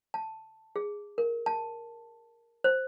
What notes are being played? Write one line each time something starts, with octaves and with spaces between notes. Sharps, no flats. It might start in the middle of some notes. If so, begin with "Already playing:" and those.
A5
G#4
A#4
A5
C5